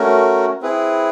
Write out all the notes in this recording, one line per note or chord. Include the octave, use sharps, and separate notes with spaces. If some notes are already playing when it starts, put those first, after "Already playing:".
Already playing: A3 C#4 F#4 A#4
C4 E4 G#4 B4